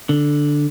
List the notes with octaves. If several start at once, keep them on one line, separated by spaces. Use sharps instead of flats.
D3